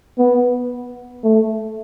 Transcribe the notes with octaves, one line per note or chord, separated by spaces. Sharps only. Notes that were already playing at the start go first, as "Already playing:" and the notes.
B3
A3